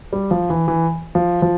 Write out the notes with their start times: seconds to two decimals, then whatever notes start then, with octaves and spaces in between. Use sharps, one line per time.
0.13 G3
0.31 F3
0.50 E3
0.68 E3
1.15 F3
1.42 F3